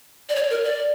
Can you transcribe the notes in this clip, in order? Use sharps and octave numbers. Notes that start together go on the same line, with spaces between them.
D5
C#5
A#4
D5